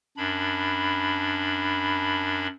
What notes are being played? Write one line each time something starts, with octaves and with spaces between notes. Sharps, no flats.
F#2 D4 B5